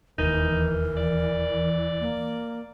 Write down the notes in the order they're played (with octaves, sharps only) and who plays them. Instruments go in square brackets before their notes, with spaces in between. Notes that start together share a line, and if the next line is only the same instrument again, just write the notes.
[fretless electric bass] E1 D#2 [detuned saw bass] E3 [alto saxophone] D#4 [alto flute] A#4
[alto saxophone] D5
[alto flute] A#3